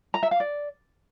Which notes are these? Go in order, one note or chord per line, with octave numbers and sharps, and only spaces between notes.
A#5
E5
F5
D5